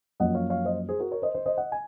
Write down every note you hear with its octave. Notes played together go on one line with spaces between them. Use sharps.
F#2 F3 A#3 D#5 F#5
C#5 F5
C#5 F5
C5 D#5
G#4 C5
F#4 A#4
A#4 C#5
C5 D#5
C5 D#5
C5 D#5
D#5 F#5
G#5